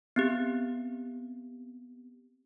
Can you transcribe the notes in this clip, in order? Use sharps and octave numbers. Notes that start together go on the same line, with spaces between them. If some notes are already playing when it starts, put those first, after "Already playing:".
B3 C4 G4